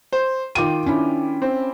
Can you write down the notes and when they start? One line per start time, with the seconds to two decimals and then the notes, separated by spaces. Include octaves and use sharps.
0.12 C5
0.55 D#3 F4 G5 D6 D#7
0.86 C#4 D4 E4
1.42 C4